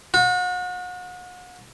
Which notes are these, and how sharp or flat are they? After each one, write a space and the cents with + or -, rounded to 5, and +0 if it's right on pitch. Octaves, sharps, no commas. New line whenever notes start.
F#4 -40